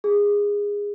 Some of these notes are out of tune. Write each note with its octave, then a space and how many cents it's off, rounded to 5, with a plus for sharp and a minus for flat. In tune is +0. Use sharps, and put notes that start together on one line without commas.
G#4 -20